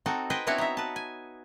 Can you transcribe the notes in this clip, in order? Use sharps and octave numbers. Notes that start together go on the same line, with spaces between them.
C4 D#4 F#4 A4
B4 C5 D#5 G5 G#5
B3 C4 D4 E4 F#4 C#5
D#4 E5
B4 A5
G#5